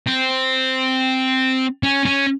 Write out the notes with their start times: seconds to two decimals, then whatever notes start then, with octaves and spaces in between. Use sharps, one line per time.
0.07 C4
1.83 C#4
2.05 C#4